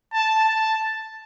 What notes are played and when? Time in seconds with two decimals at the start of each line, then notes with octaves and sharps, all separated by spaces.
0.13 A5
0.45 A5